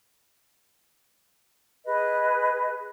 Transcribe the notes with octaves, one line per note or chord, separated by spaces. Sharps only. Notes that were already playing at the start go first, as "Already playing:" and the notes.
G#4 B4 D#5